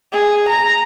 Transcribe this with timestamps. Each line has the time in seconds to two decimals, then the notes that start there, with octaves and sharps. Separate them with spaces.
0.12 G#4
0.49 A#5